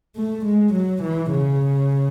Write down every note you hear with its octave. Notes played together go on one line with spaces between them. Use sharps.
A3
G#3
F#3
E3
C#3